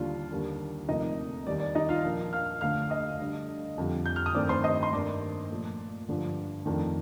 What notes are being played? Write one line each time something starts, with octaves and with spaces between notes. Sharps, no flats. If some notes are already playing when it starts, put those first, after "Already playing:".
Already playing: D#2 D3 G3 D4 F4
D#2 D3 G3 A#3 D4
D2 C3 F3 A#3 D4 D#4 D#5
D#2 D#3 G3 A#3 D5
D5
D#4 D#5
F4 F5
A#2 F3 A#3 D4
F5 F6
D2 D3 A3 F5 F6
D#5 D#6
D2 D3 G3 D4
F2 D3 G3
G6
F6
D#6
G2 D#3 A3 C4 D5 D6
C5 C6
D#5 D#6
C6
G2 D#3 A#3 D4 D5 D6
A#2 F3 A3
G2 D3 F3
F2 D#3 A3 D4